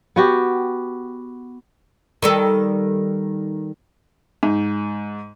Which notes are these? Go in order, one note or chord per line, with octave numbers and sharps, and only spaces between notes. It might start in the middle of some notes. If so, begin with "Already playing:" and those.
B3 F#4 G4
D#3 G3 A4
G#2